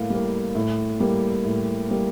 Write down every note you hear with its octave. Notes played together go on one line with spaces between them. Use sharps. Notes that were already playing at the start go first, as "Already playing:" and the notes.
Already playing: A2 G3 A#3 F5
G3 A#3
A2
G3 A#3
A2
G3 A#3